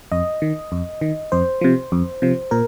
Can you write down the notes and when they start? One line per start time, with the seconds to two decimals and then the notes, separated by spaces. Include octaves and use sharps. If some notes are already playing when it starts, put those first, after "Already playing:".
0.12 F2 D#5
0.42 D#3
0.72 F2
1.01 D#3
1.32 F2 C5
1.61 C3 F3
1.92 F2
2.22 C3 F3
2.51 A#2 A#4